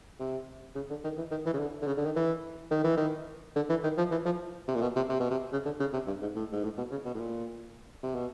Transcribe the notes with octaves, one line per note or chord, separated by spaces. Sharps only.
C3
C#3
D3
D#3
E3
D#3
E3
C#3
D3
D3
C#3
D3
D#3
E3
D#3
E3
D#3
D3
E3
D#3
F3
E3
F3
C3
A#2
B2
C3
C3
B2
C3
C#3
D3
C#3
C3
G2
G#2
A2
G#2
A2
B2
C#3
B2
A2
A#2
C3
B2